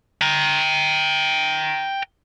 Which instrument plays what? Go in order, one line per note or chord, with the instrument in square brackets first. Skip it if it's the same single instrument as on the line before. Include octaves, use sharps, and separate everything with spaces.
[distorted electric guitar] G5 A#5